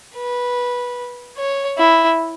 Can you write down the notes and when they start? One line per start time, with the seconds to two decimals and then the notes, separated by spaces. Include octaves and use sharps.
0.16 B4
1.38 C#5
1.78 E4